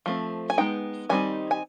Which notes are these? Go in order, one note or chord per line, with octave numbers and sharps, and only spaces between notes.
F3 A3 C4
G#5
G#3 B3 D#4 G5
D#3 G3 C4 D#4 G#5
G#5